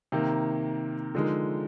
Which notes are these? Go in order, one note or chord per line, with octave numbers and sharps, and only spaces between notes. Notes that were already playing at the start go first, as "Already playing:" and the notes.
C3 D#3 A#3
D3 F3 G#3 D#4 A#4